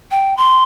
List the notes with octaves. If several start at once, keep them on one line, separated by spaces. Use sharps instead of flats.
G5
C6